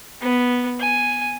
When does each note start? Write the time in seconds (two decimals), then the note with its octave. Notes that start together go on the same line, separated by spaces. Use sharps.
0.21 B3
0.80 G#5